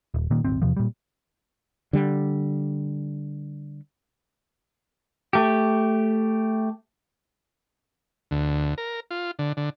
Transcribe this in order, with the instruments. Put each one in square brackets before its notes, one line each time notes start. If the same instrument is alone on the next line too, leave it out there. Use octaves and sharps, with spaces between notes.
[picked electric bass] D#1
A#2 D#3 A#3
D#1 G#1 C4
E2 C3 F3
A#2 G3
[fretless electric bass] D3 G3
[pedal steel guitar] A3 G4
[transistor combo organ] D2
A#4
F4
D3
D3